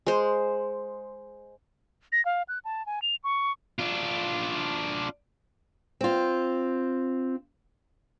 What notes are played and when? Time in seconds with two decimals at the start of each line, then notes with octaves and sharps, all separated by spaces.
0.07 G#3 C5
2.12 A#6
2.25 F5
2.48 F#6
2.65 A5
2.86 G#5
3.02 F7
3.24 C#6
3.79 D4 F4
6.01 C4 F4